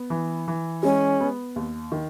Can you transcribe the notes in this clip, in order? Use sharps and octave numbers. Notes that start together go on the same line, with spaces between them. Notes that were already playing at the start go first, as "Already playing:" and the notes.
Already playing: B3
E3
E3
G#3 C#4
B3
D#2
D#3